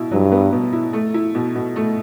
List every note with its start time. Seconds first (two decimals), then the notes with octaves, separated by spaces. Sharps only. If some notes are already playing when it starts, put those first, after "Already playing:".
Already playing: B2 E4
0.11 G2 F#3
0.32 B3
0.52 B2
0.73 E4
0.93 A3
1.14 E4
1.35 B2
1.55 B2
1.76 A3